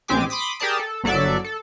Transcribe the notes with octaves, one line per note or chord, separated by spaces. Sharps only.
A#1 G#3 C4 G4 G#5 D6
B5 C6 D6 D#6 B6
G4 G#4 A#4 D5 A5 D#6
A4
G1 F#3 A4 D5 E5
A4